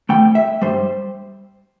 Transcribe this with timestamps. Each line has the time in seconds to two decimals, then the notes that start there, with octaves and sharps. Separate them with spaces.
0.09 C2 C3 A3 G5
0.35 E5
0.62 G2 G3 C5